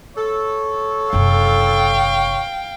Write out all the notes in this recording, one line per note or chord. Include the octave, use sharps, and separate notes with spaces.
A4 C#5
F#1 C3 F5 G5